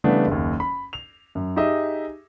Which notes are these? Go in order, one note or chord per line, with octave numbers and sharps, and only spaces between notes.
C#3 E3 G3 A3 B3 D4
F#1 D#2
B5
F7
F#2
D#4 G4 G#4 D#5 E5